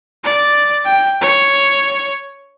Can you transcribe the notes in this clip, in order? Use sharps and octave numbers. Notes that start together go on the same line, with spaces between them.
D5
G5
C#5